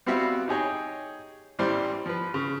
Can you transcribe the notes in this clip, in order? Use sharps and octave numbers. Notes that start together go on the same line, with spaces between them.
G3 B3 C4 F#4 E5 F5
D#4 G4 G#4 C#5
A1 E3 G3 C5 D5
F3 B4
C#3